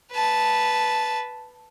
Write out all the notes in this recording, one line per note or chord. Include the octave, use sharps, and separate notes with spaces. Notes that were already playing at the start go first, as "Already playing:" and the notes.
B4 A5